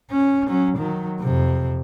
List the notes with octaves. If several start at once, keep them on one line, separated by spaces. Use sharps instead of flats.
C#4
F#3 C#4
D#3 F#3
F2 C3